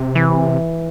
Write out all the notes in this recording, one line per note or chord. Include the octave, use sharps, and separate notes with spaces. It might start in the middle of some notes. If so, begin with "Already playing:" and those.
Already playing: C3
E3